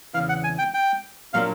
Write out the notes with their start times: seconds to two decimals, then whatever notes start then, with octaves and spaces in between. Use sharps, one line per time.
0.14 E2 C#3 E3 F5
0.29 F#5
0.44 G#5
0.58 G5
0.74 G5
1.33 A#2 F#3 A#3 D4 F5